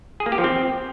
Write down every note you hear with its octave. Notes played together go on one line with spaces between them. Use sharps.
G#4
A#3
G4
F3
C4